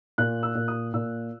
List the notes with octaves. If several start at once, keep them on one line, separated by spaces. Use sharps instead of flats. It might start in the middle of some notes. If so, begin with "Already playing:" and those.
A#2 F#6
E6
A#2
D#6
A#2 E6